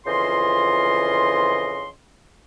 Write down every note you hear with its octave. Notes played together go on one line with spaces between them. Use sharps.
F2 C#3 E3 F4 D#5 C6